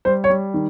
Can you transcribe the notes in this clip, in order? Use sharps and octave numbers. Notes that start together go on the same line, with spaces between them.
G3 C5
C#5
G3
D#3